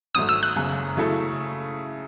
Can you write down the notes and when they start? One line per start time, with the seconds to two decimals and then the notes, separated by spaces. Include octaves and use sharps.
0.15 G#1 G#2 F#3 A3 D#6
0.29 E6
0.43 F#6
0.56 F#1 F#2 C#3
0.97 C#3 F#3 A3 E4 A4